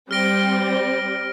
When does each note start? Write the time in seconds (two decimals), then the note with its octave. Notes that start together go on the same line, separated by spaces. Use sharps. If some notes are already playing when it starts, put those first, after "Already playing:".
0.11 G3 C4 F6 A#6 D7 G7